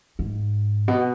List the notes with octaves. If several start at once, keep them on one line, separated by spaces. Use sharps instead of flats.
G#2
B2